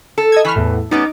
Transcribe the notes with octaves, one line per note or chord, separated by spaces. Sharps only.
A4
D#5 E6 G#6
E3 B5 C#6 F6
E2 A2
G3 B3 C#4 D#4 D6